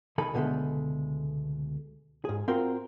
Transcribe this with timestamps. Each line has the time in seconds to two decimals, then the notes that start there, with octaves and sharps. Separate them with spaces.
0.18 C2 D#3 E3 A4 G#5 B5
0.34 C#2 B2 D3 F3 G#3 A3
2.25 G#2 G#4
2.48 C4 F4 F#4 A#4 C6